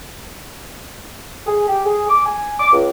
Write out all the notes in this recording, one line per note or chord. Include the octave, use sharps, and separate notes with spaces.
G#4
G4
G#4
D6
G#5
D6
C#2